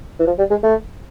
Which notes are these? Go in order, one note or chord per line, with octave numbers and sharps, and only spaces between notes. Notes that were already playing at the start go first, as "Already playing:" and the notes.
E3
F3
G3
G#3
A3